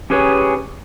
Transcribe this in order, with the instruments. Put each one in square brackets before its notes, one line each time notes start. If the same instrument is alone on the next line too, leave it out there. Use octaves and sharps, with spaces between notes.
[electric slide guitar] C#4 G4 G#4 B4 C#5